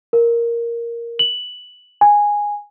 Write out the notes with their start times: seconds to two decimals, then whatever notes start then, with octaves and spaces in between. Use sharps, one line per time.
0.13 A#4
1.19 F#7
2.01 G#5